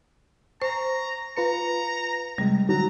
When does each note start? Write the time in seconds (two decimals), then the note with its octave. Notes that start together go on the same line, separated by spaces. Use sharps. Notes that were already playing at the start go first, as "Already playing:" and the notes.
0.62 C5 A#5 C#6
1.37 F4 B4 A#5 C#7
2.38 C3 G3 G#3
2.69 D3 F#3 A#5